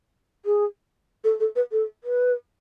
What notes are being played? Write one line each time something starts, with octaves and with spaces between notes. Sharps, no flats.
G#4
A4
A4
B4
A4
B4